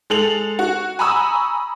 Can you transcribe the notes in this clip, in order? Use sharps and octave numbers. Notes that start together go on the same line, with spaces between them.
G#3 A4 F7 F#7
F#4
G#5 A#5 B5 C#6 D#6 E6